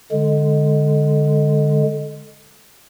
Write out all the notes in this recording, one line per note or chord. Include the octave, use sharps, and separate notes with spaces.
D3 G#3